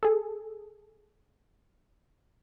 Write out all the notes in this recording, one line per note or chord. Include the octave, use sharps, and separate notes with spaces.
G#4 A4